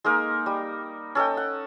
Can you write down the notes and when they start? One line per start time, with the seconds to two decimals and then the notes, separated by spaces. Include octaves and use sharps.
0.04 G#3 A#3 D#4 A#4
0.46 G3
1.15 C#4 A4 D#5 G5
1.37 F#5